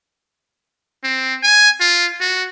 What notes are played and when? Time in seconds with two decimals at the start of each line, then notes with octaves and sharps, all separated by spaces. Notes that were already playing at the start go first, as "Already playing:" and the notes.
1.04 C4
1.43 G#5
1.80 F4
2.21 F#4